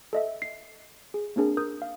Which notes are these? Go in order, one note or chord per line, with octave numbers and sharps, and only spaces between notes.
A4 D#5 E5
C7
G#4
A#3 C4 D4 G#4 A#4
A#4 D#6 G6
F5